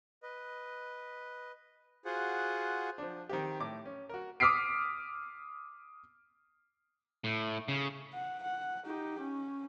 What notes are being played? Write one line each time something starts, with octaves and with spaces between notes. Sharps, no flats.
B4 D#5
F4 F#4 G#4 C5 F#5
F3 D4
D#3 C4 G4
A2 D6
C#4
F#4 A#4
D6 D#6 F6 B6 C7 D7
A2
C#3
F#5
F#5
D#4 G4
C#4